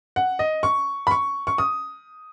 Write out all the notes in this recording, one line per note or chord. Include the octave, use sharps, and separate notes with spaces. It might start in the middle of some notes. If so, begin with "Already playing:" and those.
F#5
D#5
C#6
B5
C#6
C#6
D#6